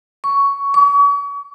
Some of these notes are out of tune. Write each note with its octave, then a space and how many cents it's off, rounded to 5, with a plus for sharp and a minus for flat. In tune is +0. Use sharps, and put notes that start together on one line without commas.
C#6 +10
C#6 +40